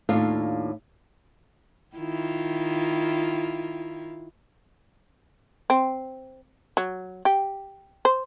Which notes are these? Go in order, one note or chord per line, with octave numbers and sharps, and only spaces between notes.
D#2 A2 D4 F4
D#3 E4 F4
C4
F#3
G4
C5